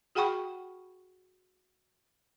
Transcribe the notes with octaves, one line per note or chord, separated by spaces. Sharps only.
F#4 G#4 F#5 G5 B5 C#6